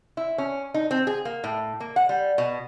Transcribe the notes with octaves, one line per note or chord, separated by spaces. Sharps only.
E4
C#4
D#4
C4
G#4
A#3
A2
A#3
F#5
G3
B2